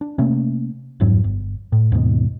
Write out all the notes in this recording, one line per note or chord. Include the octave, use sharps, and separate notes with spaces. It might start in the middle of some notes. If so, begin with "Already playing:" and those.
D4
C3 A3 A#3 C#4
D#1 F2 G#2 F#3
G1
A2
D#2 G#2 B2